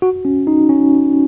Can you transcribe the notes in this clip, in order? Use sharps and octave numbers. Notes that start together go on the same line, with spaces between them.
F#4
C#4
D#4
C#4